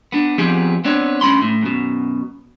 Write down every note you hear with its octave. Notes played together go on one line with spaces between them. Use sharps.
B3 D4
F3 B3 C4 G4 G#4
B3 C4 D4 C#5
G2 C#4 B5 C6
A2
F#2 B2